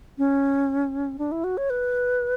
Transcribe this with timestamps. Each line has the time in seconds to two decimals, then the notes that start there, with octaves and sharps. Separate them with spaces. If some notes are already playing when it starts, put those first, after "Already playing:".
0.18 C#4
1.18 D4
1.32 E4
1.44 F#4
1.57 C#5
1.70 B4